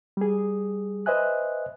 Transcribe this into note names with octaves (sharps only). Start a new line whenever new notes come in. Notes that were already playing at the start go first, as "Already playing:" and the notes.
G3 G#4
B4 C5 D#5 E5 G#5 F#6